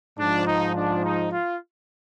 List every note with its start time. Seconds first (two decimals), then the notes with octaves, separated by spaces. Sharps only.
0.17 G#2 F3 D4
0.46 D#4
0.74 D4
1.03 D#4
1.31 F4